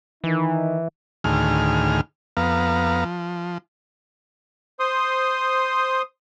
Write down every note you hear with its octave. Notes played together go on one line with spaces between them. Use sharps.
D#3 E3 D#4
D2 A2 D#3 G#4 F6
F2 B3 F5 A#5
F3
C5 C6 D#6